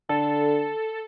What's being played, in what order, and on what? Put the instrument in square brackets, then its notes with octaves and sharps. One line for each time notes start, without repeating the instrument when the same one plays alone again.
[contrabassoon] D3 [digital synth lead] A4 [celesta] A5